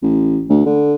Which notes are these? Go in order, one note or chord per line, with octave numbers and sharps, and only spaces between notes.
A1
D2
D3